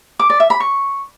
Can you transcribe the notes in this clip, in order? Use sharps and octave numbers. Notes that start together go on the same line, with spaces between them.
D6
D5
E5
B5
C#6